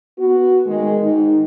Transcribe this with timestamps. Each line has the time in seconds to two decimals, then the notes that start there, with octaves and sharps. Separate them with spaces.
0.19 B3 F#4
0.67 D#3 G#3
1.02 G#2 D#3 D#4